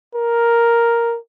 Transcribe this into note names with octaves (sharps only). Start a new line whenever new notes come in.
A#4